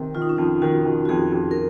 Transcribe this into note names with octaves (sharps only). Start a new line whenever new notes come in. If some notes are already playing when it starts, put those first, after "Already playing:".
Already playing: C3 D#3
D#3 F4
D#4
C#4
F2 D#4
D#3 F#4
D#3
F#4
F2 G#4
F2
A#4